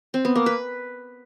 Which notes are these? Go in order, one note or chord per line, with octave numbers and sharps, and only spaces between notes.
C4
B3
A#3
B4